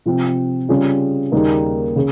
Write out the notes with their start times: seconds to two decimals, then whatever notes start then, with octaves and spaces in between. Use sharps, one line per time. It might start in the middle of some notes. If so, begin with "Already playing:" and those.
0.06 C3 F3 C4
0.69 C#3 G3 C#4 F4 G#4
1.32 D#2 C#3 G3 A#3 D#4
1.96 C#3